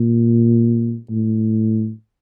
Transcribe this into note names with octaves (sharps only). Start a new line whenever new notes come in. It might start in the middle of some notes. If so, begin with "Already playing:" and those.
Already playing: A#2
A2